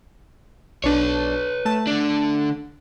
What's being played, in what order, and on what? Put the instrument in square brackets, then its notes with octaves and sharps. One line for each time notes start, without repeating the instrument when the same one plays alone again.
[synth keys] B1 D4 A5 [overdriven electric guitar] B4 C#5
[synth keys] A3 A5
[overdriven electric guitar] D3 D4